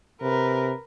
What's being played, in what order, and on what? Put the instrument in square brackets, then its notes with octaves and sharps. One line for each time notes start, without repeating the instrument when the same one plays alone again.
[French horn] C3 [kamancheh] A#4 B4